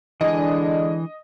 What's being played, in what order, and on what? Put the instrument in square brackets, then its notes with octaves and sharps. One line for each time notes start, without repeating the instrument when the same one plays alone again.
[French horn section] D3 G#3 D4 [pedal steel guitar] E3 G#5 [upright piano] D#5